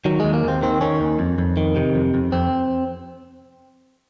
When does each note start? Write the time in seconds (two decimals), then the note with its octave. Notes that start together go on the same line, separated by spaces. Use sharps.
0.05 D#3 F#3
0.20 D#2 G#3
0.33 A#3
0.44 D#2 C4
0.62 D#3 C4
0.81 D#3 C#4
1.01 D#2
1.19 F2
1.38 F2
1.57 D#3
1.76 C3
1.95 F2
2.14 F2
2.32 F2 C4